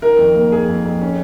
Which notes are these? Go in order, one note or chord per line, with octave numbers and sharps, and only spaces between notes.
D#3 A#4
F2
A#3
F2 G#4
F2
F2
C#4